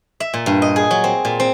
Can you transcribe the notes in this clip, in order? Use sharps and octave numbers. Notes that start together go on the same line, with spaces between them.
E5
A#2
G2
D#5
G#4
F#3
C4
A#2
C4